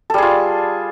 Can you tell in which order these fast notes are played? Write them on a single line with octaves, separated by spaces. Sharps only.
A4 G3 G#4 F4